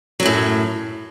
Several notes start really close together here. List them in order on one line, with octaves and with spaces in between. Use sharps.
F#3 F#2 A2